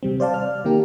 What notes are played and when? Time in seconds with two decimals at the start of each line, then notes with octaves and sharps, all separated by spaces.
0.03 C3 G3 C4
0.20 C5 D5 F5 A5
0.34 F6
0.65 D#3 A#3 G4 A#4